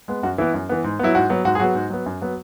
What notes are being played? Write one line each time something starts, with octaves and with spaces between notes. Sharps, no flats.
G#3 B3
F#2 F#4
E3 B3 E4
F#2
E3 B3
G#2
F#3 B3 E4
G#2 F#4
F#3 B3
G#2 F#4
G#4
F#3 B3 F#4
G#2
F#3 B3
F#2
F#3 B3